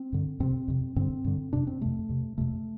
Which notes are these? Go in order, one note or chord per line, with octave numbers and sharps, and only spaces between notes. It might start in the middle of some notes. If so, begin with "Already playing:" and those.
Already playing: C4
G2 D3
F2 C3 C4
F2 C3
G2 D3 C4
G2 D3
F2 C3 D4
C4
F2 C3 A3
F2 C3
F2 C3 A3